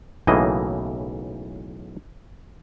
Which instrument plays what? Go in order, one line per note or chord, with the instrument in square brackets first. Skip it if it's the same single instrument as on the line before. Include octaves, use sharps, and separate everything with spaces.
[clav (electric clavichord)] B1 A2 C#3 E3 A#3 D#5